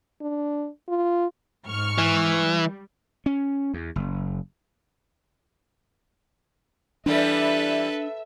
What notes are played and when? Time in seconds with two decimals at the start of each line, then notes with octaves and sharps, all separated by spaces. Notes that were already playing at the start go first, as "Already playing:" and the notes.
0.21 D4
0.89 F4
1.67 G#2 C#6 F6
1.98 E3
2.44 G3
3.26 C#4
3.74 E2
3.96 F#1
7.06 E3 G3 D4 A4 B4 E5